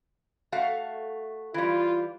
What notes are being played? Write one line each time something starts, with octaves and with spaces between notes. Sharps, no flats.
A3 F#4 F5
E3 G3 F4